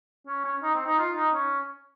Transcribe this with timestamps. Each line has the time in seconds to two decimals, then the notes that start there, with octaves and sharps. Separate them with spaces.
0.27 C#4
0.44 C#4
0.62 D#4
0.75 C4
0.86 D#4
0.99 F4
1.16 D#4
1.34 C#4